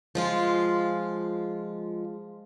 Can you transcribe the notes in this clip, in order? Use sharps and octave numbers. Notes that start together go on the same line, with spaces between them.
F3 G#3 F4